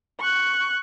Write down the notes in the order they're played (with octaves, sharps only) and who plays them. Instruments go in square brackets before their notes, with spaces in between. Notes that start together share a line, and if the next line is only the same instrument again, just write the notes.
[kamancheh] C#6 F#6